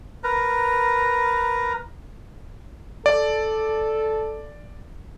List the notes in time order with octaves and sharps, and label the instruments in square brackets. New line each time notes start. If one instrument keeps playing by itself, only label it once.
[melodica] A#4 B4 A#5
[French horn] A4 [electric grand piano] D5